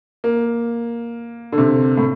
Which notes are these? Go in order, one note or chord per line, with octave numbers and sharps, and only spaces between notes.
A#3
D3
C3
A2